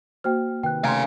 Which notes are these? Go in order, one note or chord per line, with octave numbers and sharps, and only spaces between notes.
A#3 F#4 C5 G5 F6
C3 D#3 B4 G5 F#6
C#3 A3 F5 G#5 A#5 C6